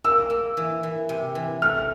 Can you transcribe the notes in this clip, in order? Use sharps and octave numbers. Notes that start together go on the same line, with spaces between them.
A#3 E6
A#3
E3
E3
C3
E3
A3 F6